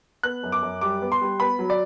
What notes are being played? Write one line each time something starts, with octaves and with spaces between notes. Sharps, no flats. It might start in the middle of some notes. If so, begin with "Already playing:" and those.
B3 F#6
F#2
D6
F#2
G3 D6
B3
C6
G3
B3 B5
F#3
D5